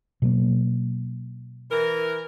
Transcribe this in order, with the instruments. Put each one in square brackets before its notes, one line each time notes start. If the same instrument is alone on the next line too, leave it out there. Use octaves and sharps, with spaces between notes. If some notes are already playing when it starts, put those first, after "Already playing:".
[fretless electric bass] B2 F#3 A#3
[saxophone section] E3 A#4